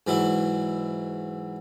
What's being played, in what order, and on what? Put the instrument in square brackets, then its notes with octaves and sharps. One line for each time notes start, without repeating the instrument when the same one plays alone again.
[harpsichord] G#2 E3 F#3 E4